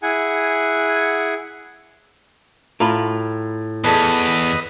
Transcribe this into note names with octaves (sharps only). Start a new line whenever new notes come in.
E4 G#4 F#5 G#5
A2 F4 A#5 B5
E2 G#4 A4 B4 D5 D#5